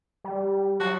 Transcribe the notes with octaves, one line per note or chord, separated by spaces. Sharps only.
G3
F#3 F#4